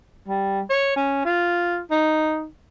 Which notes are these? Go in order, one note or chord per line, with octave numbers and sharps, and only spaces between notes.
G3
C#5
C#4
F4
D#4